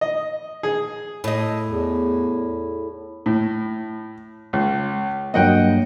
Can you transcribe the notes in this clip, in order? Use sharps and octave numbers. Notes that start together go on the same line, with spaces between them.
D#5
G#4
A2 D#5
E2
A2
C#2
G2 F#3 A#3 D#5 F#5 G5